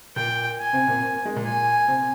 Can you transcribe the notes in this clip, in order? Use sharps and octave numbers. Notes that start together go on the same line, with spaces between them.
A#2 A#3 G5
G#5
C3 C4
A#2 A#3
C4
A#3
G#3
A#2 A#3
G#5
C3 C4